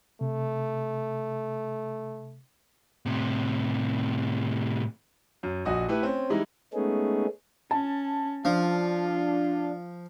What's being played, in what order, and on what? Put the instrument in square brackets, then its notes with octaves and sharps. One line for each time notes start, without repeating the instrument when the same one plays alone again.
[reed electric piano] C3 [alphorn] A3
[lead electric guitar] A2 C3
[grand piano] F#2
A#1 F#4 D#5 D#6
A3 E4 G4 B4
C4 C#4
E3 G3 G#3 D#4 E4
[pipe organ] G#3 A3 B3 C#4 D#4 G#4
[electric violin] C#4 [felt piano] A5
[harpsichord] F3 [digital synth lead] D4 [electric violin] F4